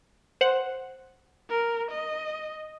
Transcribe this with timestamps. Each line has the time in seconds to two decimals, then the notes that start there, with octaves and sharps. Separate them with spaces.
0.41 C5 F#5
1.49 A#4
1.91 D#5